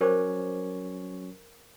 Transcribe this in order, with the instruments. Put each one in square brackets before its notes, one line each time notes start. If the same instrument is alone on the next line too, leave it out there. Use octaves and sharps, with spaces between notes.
[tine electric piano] F#3 C#4 C#5 [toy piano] A#4 C5 D6